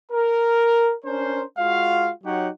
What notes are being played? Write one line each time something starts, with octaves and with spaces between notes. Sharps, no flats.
A#4
C#4 D4 A#4 C5
G#3 F4 F#4 F5
F#3 D#4 F#4 G4 C#5 F#5